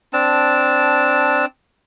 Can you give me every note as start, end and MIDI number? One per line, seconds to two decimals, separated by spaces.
0.13 1.45 60
0.13 1.45 62
0.13 1.45 81